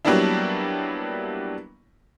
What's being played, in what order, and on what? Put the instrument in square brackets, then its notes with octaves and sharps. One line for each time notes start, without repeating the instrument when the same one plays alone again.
[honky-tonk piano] F#3 G3 A#3 B3 D4 E4